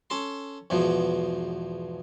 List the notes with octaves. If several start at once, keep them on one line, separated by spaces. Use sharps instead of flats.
C#4 A4 A5 C6
E2 G#2 B2 F3